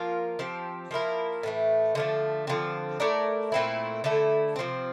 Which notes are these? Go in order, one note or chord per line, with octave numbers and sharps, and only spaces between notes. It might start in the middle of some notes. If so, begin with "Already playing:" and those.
Already playing: F3 A#3 F4 A#4
F3 C4 G4
F3 A#3 E4 A#4
A2 E3 A3
D3 F3 A3
D3 F3 C4
A3 E4 A#4 D5
A#2 A3 C4 E4
D3 A3 E4 A4
C3 F3 C4